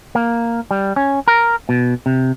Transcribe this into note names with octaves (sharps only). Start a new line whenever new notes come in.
A#3
G3
C#4
A#4
B2
C3